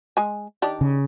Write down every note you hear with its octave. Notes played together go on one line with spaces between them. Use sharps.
G#3 G#5
D#3 D4 G4
C#3